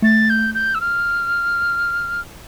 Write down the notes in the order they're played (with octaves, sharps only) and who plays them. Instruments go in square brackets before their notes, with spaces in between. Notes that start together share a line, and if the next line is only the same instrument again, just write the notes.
[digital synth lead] A3 [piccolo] A6
[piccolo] G6
G6
E6
F6